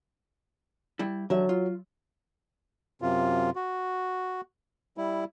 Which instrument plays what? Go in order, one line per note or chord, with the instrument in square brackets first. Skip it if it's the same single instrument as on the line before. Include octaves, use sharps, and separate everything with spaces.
[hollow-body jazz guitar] G3 E4
[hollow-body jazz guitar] D3 E5 [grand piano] F#3
[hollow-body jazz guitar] F4
[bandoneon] F#2 C3 F4
F#4
G3 E4